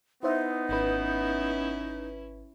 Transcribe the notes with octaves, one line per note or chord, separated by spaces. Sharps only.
B3 D#4 E4 C5 E5
G#1 C#4 E4 B4